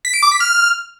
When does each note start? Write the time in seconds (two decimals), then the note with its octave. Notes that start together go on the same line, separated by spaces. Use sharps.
0.05 B6
0.14 D7
0.23 D6
0.31 B6
0.40 F6